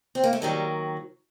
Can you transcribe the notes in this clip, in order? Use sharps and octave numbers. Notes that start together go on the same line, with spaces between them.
C4
A#3
A3
D#2 D#3 F#3 G3